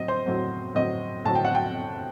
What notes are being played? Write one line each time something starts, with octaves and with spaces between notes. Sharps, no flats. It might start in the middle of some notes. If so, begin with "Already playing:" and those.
Already playing: A2 F#3 C4 D#5
C5
A2 F#3 C4
A2 F#3 C4 D#5
A2 F#3 C4 A5
G5
F#5
G5